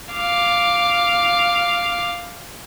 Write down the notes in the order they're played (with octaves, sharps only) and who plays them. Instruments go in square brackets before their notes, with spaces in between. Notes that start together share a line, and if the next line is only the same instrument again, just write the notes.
[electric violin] F5 D6